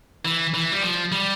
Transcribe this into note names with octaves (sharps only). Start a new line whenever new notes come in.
E3
E3
G3
F3
G3